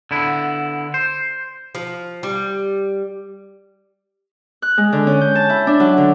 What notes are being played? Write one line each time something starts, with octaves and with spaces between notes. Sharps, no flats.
D3 B3 E4
C5
F3
G3
F#6
G#3
D3
C#4
G6
A5
E4
D4
F#3
D3